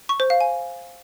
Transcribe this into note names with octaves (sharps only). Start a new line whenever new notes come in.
C#6
C5
F5
G#5